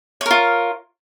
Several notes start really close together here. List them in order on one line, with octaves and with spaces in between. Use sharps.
C#5 A#4 F4